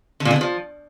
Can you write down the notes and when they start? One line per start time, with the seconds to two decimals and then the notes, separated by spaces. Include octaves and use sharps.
0.20 D3
0.25 A#2
0.31 D3
0.36 B3
0.41 F3